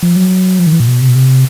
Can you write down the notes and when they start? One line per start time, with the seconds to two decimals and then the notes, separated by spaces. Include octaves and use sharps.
0.03 F3
0.16 F#3
0.59 F3
0.67 D#3
0.72 E3
0.80 A#2
0.87 B2
1.02 C3
1.09 B2
1.15 C3